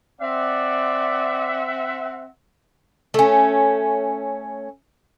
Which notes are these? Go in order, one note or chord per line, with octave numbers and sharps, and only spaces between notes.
C4 D5 E5 F#5
A3 C#4